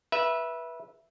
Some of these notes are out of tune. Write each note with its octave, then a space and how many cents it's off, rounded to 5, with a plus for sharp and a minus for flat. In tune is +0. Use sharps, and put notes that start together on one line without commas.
B4 -20 E5 +0